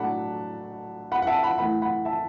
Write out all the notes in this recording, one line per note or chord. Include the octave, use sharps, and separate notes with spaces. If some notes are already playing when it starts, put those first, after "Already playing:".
Already playing: A2 F#3 A3 D4 F#5 A5 B5
F#5 B5
F#5
E5 A5
F#5 B5
E3 A3 E4 F#5 B5
F#5 B5
E5 A5